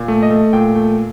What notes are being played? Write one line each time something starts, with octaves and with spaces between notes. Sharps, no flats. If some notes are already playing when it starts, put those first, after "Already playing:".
Already playing: A#2
A3
D#5
A3
A#2 G5
A3